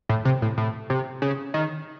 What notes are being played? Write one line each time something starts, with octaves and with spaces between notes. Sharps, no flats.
A2
C3
A2
A2
C3
C#3
D#3